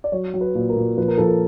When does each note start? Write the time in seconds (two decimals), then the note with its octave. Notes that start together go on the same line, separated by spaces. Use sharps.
0.04 D5
0.12 F#3 C#5
0.34 F#3
0.41 B4
0.55 A#2
0.69 A#4
0.77 A#2
0.97 F3 B4
1.08 A#4
1.17 F3 A4
1.28 A#4